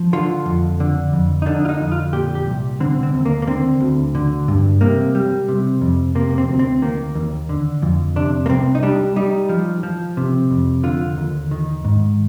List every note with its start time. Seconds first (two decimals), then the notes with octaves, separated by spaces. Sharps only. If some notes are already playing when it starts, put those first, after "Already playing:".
Already playing: F3
0.13 D3 F4
0.46 F2
0.80 D3
1.13 F2
1.42 D#4
1.46 D3 D4
1.65 F4
1.69 D#4
1.80 F2
1.92 F4
2.13 A#2 G4
2.35 G4
2.47 C2
2.80 D3 C4
3.03 C4
3.14 D#2
3.25 A#3
3.42 A#3
3.47 D3 C4
3.80 D2
4.15 D3
4.48 G2
4.81 C3 A#3
5.15 G3
5.48 C3
5.81 F2
6.15 C3 A#3
6.31 A#3
6.38 C4
6.48 D2
6.59 C4
6.82 D#3 A#3
7.15 D#2
7.49 D3
7.82 F2
8.16 C3 D4
8.46 A#3
8.50 C2 C4
8.75 D#4
8.83 G3 D4
9.16 G3 D#4
9.49 F3
9.83 F3
10.17 C3
10.50 F2
10.83 D3 F4
11.18 D#2
11.51 D#3
11.84 G#2